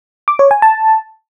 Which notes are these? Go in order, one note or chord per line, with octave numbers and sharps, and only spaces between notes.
D6
C#5
G#5
A5